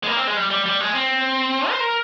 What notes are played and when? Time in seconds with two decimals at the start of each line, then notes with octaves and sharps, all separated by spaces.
0.03 G#3
0.07 A#3
0.17 C4
0.27 G#3
0.37 G3
0.50 G3
0.66 G3
0.80 G#3
0.94 C4
1.70 C5
1.80 A#4